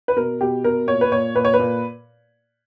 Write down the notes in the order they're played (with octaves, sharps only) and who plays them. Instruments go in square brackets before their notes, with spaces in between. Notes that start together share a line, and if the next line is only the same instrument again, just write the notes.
[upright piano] B4
B2 A#4
B2 G4
B2 A#4
A#2 C#5
B4
A#2 C#5
A#2 B4
C#5
B4
A#2